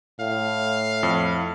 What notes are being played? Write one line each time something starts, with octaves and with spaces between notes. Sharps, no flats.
A2 F5
F2